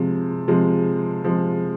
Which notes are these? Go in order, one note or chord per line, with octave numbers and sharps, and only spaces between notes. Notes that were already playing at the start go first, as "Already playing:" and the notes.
Already playing: C3 F3 G#3
C3 F3 G#3
C3 F3 G#3